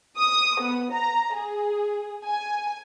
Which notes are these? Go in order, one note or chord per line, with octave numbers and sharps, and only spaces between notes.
D#6
B3
A#5
G#4
G#5